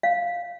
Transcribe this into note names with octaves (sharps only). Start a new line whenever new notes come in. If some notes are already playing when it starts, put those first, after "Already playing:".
F5